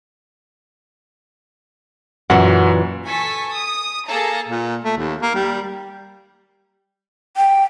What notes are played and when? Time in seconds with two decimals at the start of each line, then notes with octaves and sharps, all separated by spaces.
2.30 F#2 A#2 E3 F#4 F#5
3.06 A4 G#5 C#6 B6
3.55 D#6
4.09 A#3 G#4 A4 A5 A#5
4.48 A#2
4.84 A3
4.97 D#2
5.22 A#3
5.35 G3
7.37 G5